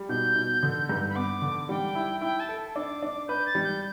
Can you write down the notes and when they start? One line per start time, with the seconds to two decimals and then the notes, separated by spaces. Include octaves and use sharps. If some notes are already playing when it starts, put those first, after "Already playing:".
Already playing: G3
0.09 B2 G6
0.36 B2
0.63 D3
0.89 G2
1.09 B5
1.15 B3 D6
1.42 D3
1.69 G3 G5
1.95 E4
2.21 E4 G5
2.40 A5
2.49 A4
2.75 D4 D6
3.02 D4
3.28 B4 G6
3.46 A6
3.55 G3
3.64 G6